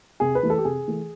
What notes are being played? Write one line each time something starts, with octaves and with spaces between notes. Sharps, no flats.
C3 G#4
B4
E3 A3
A4
G4
C3 G#4
E3 A3